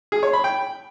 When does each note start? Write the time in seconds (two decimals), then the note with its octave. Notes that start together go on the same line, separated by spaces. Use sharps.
0.12 G#4
0.23 C#5
0.33 B5
0.44 G5